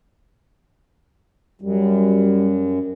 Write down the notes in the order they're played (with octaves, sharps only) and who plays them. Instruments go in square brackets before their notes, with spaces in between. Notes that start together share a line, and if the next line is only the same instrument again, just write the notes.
[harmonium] F#2 [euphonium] G3